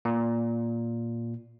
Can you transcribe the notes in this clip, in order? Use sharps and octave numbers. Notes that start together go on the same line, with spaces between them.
A#2